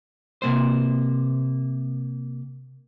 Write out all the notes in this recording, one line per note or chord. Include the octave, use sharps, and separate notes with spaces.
C3 A#3 C5